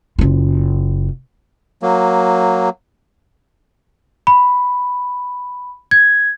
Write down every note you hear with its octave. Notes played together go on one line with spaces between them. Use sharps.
F#1 F4
F#3 A#3
B5
G#6